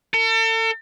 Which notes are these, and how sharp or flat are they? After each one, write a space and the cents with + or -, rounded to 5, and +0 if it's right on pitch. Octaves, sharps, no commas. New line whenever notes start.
A4 +40